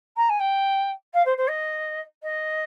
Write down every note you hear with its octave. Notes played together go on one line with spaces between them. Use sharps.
A#5
G#5
G5
F5
C5
C5
D#5
D#5